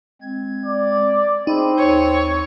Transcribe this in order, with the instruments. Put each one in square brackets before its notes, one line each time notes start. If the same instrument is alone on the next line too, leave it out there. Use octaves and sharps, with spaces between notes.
[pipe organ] G#3 C4 G#6
[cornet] D5
[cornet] C4 [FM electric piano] D#4 [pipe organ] G#4 B5
[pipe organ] D#2 [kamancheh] C#5